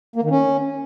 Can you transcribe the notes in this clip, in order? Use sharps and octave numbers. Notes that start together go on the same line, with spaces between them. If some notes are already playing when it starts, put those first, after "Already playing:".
A#3
D#3
C#4